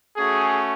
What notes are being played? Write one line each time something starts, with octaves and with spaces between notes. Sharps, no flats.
A3 C#4 F#4 G#4